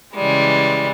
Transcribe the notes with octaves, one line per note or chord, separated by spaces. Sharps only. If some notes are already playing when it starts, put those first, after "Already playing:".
C#3 E3 G3 G#3